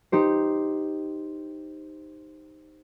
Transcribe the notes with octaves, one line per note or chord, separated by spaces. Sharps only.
D#4 G4 C5